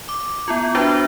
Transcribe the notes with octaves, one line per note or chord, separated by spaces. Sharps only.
D6
B3 E4 F4
D4 E4 F#4 B4 C5 E5